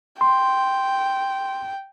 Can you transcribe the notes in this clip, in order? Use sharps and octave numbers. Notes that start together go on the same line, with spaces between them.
G5 C6